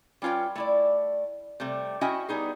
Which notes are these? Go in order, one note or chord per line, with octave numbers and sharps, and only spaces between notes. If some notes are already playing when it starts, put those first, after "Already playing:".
G3 C#4 F4 B4 G5
A3 E4 D5
C3 G3 A3
C#4 E4 F#4 D#5 E5 G5
G3 B3 D#4 G#4